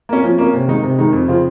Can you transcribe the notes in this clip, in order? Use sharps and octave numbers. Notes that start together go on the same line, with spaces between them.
A#3 C#4
F3
A#3 C#4
C3
D#3 G#3 D#4
C3
D#3 G#3 D#4
F2
C#3 F3 C4 F4